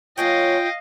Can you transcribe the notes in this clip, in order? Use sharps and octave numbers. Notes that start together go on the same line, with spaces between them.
F#3 A#3 C#4 F4 D#5 F5 G5